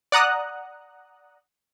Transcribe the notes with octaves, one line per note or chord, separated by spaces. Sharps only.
D5 F#5 A#5 D#6 F#6